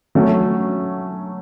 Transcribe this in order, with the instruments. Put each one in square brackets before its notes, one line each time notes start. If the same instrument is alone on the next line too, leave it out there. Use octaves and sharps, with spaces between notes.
[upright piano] F#3 A3 C#4